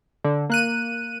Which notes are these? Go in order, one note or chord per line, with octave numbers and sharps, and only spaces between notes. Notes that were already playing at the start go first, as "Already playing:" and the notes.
D3
A#3 F#6 D#7